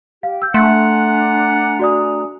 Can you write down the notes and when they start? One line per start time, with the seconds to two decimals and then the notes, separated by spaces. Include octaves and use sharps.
0.23 G4 F5
0.42 E6 G6
0.54 A3 D4 F#5 G#5 A#5 C6
1.79 F#4 D5 D#6